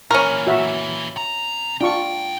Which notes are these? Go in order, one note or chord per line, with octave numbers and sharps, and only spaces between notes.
A#2 E3 C#4 A#4 C#6
F#4 E5
C3 A#5
G#2 D4 F4 G5 C#6